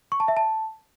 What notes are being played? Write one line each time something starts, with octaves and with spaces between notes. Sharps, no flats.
C#6
A5
E5
A5